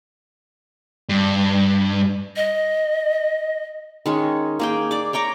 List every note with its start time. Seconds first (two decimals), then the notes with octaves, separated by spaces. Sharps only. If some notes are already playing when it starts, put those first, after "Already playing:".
1.09 G2
2.36 D#5
4.06 D#3 G#3 C#4
4.59 A#3 G#4 G5
4.91 D5 D6
5.13 C#5 G5 A#5 D6